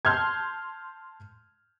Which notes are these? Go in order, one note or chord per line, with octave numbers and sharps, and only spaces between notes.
A5 C6 F6 G6 G#6